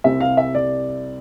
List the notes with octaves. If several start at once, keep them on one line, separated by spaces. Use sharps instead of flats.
C2 C3 G3 C4 E5
F5
E5
D5